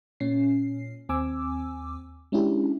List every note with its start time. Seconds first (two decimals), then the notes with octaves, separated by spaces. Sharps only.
0.20 A#2 C#4 C7
1.09 D#2 C4 G#5 D6 E6
2.32 G#3 C#4 D4 E4 G4